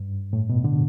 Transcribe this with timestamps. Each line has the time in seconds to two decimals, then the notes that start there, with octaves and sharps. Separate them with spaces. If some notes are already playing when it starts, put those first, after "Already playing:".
Already playing: G2
0.33 A2
0.49 B2
0.64 D3